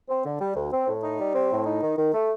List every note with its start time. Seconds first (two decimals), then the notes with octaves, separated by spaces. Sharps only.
0.09 C4
0.25 D3
0.40 G3
0.56 D2
0.72 C4
0.88 A2
1.03 D#4
1.19 G3
1.35 C4
1.51 A2
1.66 D#4
1.82 D#3
1.98 D#3
2.14 A3